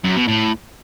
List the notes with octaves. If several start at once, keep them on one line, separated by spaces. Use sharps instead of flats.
F#2
B2
A2